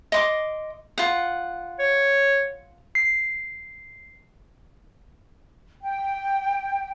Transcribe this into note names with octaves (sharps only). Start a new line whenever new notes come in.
D#5 C6 D6
F4 F#5
C#5
C7
G5